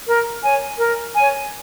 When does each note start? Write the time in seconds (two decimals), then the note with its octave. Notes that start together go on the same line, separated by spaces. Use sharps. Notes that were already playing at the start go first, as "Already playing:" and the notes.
0.07 A#4
0.42 C#5 G#5
0.79 A#4
1.14 C#5 G#5